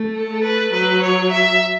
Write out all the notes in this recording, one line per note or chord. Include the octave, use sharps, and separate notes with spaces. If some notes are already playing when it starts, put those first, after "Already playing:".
Already playing: A3
A4
A3
B4
F#3 B4
C#5
E5